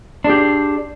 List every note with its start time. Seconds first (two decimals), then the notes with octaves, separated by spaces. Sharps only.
0.24 D4
0.27 G#4
0.30 G4